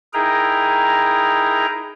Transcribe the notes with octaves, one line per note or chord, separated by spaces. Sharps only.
D#4 E4 G#4 A#4 G5 A#5